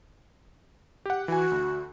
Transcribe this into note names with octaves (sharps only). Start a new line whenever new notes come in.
G4 F#5
E3 F#4 G#5
D2